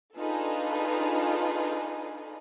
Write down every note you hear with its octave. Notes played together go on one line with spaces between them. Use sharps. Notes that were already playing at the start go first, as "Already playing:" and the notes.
D4 D#4 F4 G#4 A4 B4